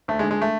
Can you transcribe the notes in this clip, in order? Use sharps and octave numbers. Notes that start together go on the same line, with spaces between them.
D2 A3
G#3
D3
G#3
A3